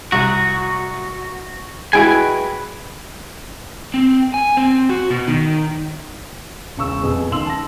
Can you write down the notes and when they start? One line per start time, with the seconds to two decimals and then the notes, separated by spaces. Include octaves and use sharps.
0.12 C2 F#4
1.93 G#3 E4 F#4 B4 G5 G#5
3.94 C4
4.34 G#5
4.57 C4
4.89 F#4
5.10 B2
5.27 D#3
6.77 E1 C#2 C#6 E6
7.02 F2 B2 G#4
7.32 C#2 D#3 C6 E6 F#7
7.46 A5 A#6